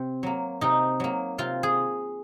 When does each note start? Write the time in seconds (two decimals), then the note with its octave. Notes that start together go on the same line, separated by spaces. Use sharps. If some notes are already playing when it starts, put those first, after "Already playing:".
Already playing: C3 C4
0.23 F#3 A#3
0.61 C3 D#4
1.00 F#3 A#3
1.38 C3 F4
1.63 G#4